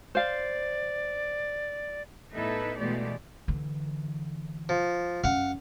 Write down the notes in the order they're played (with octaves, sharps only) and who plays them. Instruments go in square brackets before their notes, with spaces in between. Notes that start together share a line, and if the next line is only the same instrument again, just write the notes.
[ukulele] C5 F5 [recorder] D5
[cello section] A2 B3 D#4 E4 A4 B4
B2 E3 G#3 A3 G4 D5
[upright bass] D3 E3
[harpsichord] F3
[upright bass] F#2 [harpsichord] F5 F#5